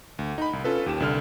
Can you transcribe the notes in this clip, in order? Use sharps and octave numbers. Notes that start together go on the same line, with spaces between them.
D2
D#4 B5
C2
C#4 F4 A4 B4
D#2 G4 E7
C2 D3 F6